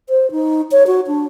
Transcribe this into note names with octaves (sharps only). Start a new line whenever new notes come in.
C5
D#4
C#5
F#4
D4